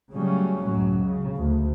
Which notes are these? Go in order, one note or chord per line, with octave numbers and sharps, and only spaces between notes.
C#3 F#3 G3 A3 C#4
C#2 F#2 A2 F#3
C#3
D2